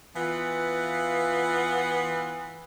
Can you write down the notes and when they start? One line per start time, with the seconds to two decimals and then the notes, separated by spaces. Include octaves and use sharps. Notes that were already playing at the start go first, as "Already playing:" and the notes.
0.16 E3 B3 F4